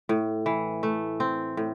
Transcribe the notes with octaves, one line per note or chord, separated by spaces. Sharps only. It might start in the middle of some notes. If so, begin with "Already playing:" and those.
A2
E3
A3
C4
A2